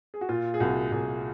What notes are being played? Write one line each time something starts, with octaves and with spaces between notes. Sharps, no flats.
G#4
F#4
A#2 F4
G#4
C2 F#4
C2 G#4